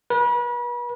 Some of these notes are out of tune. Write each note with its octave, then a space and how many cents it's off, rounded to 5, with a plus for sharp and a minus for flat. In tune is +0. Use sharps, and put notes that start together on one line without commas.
B4 -35